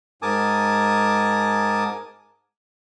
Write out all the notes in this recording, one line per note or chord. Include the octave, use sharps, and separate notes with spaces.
G#2 A#4 G#5 A5 D6 D#6